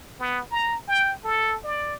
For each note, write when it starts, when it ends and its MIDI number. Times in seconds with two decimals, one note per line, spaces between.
0.19 0.42 59
0.51 0.76 82
0.88 1.13 79
1.24 1.57 69
1.65 1.95 74